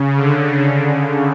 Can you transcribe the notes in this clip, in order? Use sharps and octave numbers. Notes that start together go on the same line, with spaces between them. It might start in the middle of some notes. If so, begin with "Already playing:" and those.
Already playing: C#3
D3